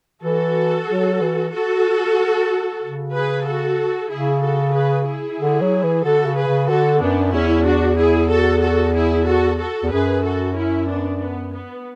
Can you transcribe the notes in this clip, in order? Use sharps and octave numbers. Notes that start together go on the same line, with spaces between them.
E3 F#4 A4
F#3
E3
F#4 A4
C#3
G#4 B4
F#4 A4
C#3 E4 G#4
F#4 A4
G#4 B4
E4 G#4
D3
F#3
E3
D3 F#4 A4
C#3
G#4 B4
C#3
D3 F#4 A4
F#2 B3 D4
E2 C#4 E4
D4 F#4
E4 G#4
F#4 A4
F#4 A4
E4 G#4
F#4 A4
F#4 A4
E2
F#2 G#4 B4
F#4 A4
C#4 E4
B3 D4
B3
B3